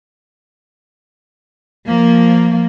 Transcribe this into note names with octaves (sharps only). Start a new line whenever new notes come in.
F3 A#3